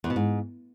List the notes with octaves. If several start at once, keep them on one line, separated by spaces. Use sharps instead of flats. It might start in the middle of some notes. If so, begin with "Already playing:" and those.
E2
B2
G#2